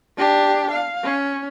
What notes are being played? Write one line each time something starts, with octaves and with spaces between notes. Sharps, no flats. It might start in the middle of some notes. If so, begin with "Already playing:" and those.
D4 G4
F5
C#4